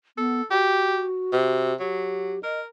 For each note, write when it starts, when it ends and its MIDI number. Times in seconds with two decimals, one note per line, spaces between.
0.18 0.42 59
0.18 0.45 69
0.51 1.73 66
0.51 1.04 67
1.33 1.75 48
1.80 2.38 54
1.80 2.42 67
2.43 2.66 70
2.43 2.60 75